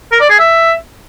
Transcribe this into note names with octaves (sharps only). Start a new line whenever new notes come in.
A#4
D5
G#4
E5